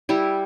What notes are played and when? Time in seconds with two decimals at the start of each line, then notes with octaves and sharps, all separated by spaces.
0.09 G3 E4 G4